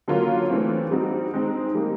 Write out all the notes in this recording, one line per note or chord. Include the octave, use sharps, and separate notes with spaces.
D3 F#3 A#3 C#4 F4
E3 A3 C4
G3 C4 D#4 F#4
D#3 G#3 C4 D#4
D#3 G3 A#3 D#4 G4